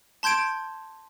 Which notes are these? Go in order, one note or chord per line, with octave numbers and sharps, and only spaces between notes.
A5 C6 G6 G#6 D7